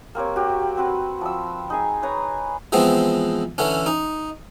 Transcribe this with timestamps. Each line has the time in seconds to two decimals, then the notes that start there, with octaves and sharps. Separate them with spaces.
0.15 A#3 C4 G4 C#5
0.36 F#4 G4
0.77 C4 F#4 B4
1.21 F3 E6
1.70 D#4 G#4 G#5
2.03 B4 C#5 A#5
2.72 E3 F3 G#3 B3 C4
3.58 D3 E3 C#4
3.86 D#4